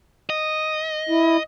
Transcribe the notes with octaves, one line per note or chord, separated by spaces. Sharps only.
D#5
E4